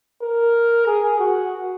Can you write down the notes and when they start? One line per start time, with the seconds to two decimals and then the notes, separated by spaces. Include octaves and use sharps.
0.23 A#4
0.87 G#4
1.20 F#4